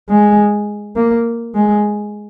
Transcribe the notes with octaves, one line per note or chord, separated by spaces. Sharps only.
G#3
A#3
G#3